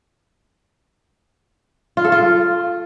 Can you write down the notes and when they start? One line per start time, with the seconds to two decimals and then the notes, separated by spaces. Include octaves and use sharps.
1.97 F4
2.05 A4
2.12 F4